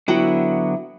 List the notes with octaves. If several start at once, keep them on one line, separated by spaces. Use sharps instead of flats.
D3 F#3 B3 E4 F#4 G5